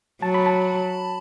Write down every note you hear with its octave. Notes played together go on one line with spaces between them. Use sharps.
F#3 A5
B5
A5